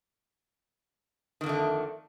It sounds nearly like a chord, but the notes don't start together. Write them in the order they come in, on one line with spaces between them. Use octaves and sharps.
D#3 F2 D3 A3